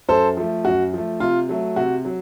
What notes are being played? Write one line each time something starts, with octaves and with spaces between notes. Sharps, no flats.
F#2 A4 C5
F3 A3
F#2 F#4
F3 A3
C3 F4
F#3 A3
C3 F#4
F#3